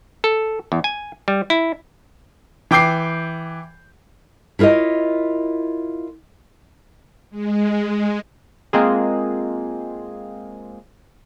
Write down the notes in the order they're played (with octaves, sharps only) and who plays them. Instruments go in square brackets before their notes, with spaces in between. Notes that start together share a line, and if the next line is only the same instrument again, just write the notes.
[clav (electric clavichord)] A4
E2
G#5
G3
E4
[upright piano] E3 G5 D6 G6 C7
[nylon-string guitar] E4 F4 A#4 C#5 D#5
[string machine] G#3
[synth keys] G#3 A#3 C4 F4 G#4